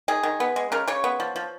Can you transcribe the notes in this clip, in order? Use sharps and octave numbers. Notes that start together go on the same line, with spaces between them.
D#3 G#4
D#3
B3
G#3
C#3 A#4
C#3 C#5
B3
F3
F3